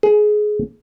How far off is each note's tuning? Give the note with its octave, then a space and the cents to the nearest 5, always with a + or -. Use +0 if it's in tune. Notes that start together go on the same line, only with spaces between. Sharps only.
G#4 +20